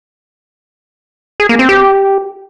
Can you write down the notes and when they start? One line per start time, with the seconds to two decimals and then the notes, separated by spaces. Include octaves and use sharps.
1.40 G#4
1.49 A#3
1.59 C4
1.69 G4